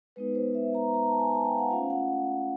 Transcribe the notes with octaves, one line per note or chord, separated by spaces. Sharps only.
G#3 B3 D#4 B4
C5
E5
A#5
A#5
A5
G#5
A5
G5
F5
F#5
A3 C#4 F4 F5
F#5